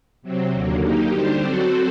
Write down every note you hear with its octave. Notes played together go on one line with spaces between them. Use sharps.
C3 F#3 C4
D#2 D3 F#3 A#3
F#3 A#3 D#4 G4
D3 G3 D4 G4 C5
F#3 C4 F#4 A4 C5